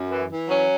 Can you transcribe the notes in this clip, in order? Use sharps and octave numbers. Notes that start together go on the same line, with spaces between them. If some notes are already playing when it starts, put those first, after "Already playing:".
Already playing: F#2
E3
E3
F#3 C#4